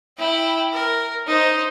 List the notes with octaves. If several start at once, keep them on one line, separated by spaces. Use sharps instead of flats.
E4 G5
A#4
D#4 C5